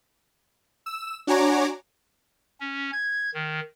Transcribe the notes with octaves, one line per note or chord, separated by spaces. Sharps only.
E6
D4 F#4 C#5 G#5 A#5 D6
C#4
G#6
D#3